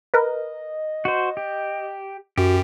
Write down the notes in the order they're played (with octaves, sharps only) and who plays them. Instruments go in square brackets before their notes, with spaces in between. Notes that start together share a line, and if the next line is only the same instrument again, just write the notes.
[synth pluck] A#4 B4 [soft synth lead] D#5
[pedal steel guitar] F#4 C5
G4
[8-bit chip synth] F#2 [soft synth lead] F#4 [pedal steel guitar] G4